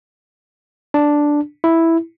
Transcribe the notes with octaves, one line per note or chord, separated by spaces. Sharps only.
D4
E4